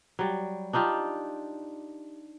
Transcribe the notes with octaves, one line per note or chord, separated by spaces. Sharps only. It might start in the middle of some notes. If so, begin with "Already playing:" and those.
F#3 G3
D4 D#4 F4 G4